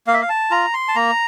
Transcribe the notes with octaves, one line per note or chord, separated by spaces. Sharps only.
A#3 F5
E5
F5
A5
F4 A#5
C6
A5
A#3 A#5